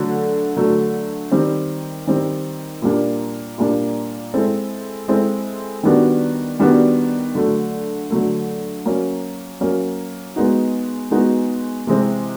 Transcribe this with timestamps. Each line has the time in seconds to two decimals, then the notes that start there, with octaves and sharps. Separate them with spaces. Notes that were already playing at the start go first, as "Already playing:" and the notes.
Already playing: D3 F#3 A3
0.56 D3 F#3 A3
1.32 D#3 G3 C4
2.07 D#3 G3 C4
2.82 A#2 G3 A#3 D4
3.58 A#2 G3 A#3 D4
4.34 G#3 C4 E4 A4
5.08 G#3 C4 E4 A4
5.83 D#3 G3 B3 D4 F#4
6.59 D#3 G3 B3 D4 F#4
7.35 D3 F#3 A3
8.10 D3 F#3 A3
8.86 F#3 A#3 C#4
9.61 F#3 A#3 C#4
10.36 G#3 B3 D#4 F#4
11.11 G#3 B3 D#4 F#4
11.87 C3 E3 G#3 C4